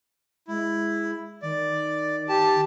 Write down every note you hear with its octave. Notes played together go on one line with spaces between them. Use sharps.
G#3 E4
D#3 D5
G4 A5